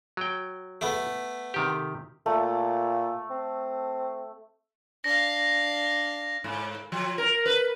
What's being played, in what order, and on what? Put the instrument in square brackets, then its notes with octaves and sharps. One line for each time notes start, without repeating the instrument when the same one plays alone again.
[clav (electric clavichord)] F#3 G5
[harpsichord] A3 B3
[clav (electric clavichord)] C3 D#3 G4
[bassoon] A#2 [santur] A3
[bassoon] C4
[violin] D4 F5 [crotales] A#6
[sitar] G#2
F3
A#4
B4